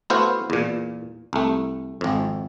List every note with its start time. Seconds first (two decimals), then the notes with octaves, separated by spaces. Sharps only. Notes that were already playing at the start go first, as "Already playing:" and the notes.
0.10 A3 B3 E4 F#4 C5 F5
0.50 E2 A#2
1.33 C2 A3
2.01 G#1 F2